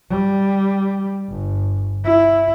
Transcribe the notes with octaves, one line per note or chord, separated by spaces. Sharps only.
G3
G1
E4